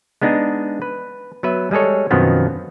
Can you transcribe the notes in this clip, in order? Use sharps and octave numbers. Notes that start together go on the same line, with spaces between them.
G#3 B3 D4 D#4 G#4
B4
F#3 B3 B4 E5
G3 G#3 G#4 A4 C#5
F#2 B2 D#3 F3 B3 C4